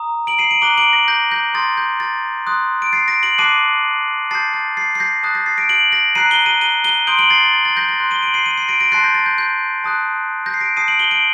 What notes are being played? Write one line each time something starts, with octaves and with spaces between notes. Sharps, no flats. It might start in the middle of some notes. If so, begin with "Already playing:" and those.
Already playing: A#5 D#6
D7 F#7
C7 D#7
D7 F#7
A#5 D6 F#6 D#7 G7
D7 F#7
A#6 D7
G6 A#6
G6 A#6
C6 D#6 G6 A6
G6
A6
C6 D#6 F#6
D7
A6 C7
A#6 D7
D7 F#7
A5 D6 F#6 C7 D#7
A5 D#6 G6 A6 C7
A6
A6 C7
C7
G6 A#6
A5 D#6 F#6 A6
G6 A#6
A6 C7
A#6 D7
D7 F#7
A#6 D7
A#5 F#6 C7 D#7
D#7 G7
D#7 G7
D#7 G7
D#7 G7
C6 D#6 G6 D7 F#7
D7 F#7
A6 C7
A6
A6
A6
G6 A#6
A6
C6 F#6 A6
D#7 G7
D7 F#7
C7 D#7
C7 D#7
C7 D#7
A#6 D7
A#6 D7
A5 C6 F#6 A6 C7
G6 A#6
A6
G6
G6
A5 D#6 F#6
G6 A#6
C7
A#6 D7
A5 D#6 G6 C7 D#7
D7 F#7
D#7 G7
D7 F#7